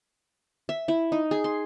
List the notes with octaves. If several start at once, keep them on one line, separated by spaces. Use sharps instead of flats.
E5
E4
D#4
G#4
C6